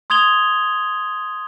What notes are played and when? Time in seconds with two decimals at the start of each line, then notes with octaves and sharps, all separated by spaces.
0.10 C6 D#6 G#6 F7 G7